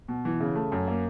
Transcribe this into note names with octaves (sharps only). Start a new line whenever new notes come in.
B2
E3
C#3
A3
F#2
A#3